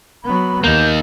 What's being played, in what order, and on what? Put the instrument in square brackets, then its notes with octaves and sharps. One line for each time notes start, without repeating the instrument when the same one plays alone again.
[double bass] F#3 B3 [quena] B5
[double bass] D#2 [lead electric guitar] A#3 D#4 [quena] G6